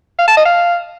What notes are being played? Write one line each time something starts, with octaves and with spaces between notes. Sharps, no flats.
F5
A5
D#5
F5